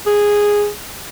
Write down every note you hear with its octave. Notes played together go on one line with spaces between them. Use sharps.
G#4